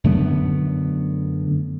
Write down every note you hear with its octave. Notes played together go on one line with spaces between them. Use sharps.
F#2 D3 A3 B3